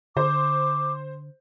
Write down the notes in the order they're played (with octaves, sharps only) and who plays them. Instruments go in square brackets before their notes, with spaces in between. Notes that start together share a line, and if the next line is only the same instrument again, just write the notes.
[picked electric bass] D3 [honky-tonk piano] C5 [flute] D6